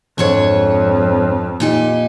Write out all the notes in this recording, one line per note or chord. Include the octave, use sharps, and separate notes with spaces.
F2 G#2 D4 C#5
A#2 D#4 G4